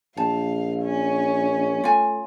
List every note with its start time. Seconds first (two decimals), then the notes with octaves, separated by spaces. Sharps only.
0.17 A#1 F5 A5
0.84 C#4
1.84 A3 F4 G#5